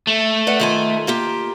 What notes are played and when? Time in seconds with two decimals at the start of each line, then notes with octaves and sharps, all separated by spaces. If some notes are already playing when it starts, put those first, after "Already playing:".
0.07 A3
0.47 B4 D5 F#5
0.60 D#3 F4 G#5
1.07 A#3 F4 G4